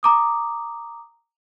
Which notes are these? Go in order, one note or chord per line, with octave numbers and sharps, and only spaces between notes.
A#5 D6 D#6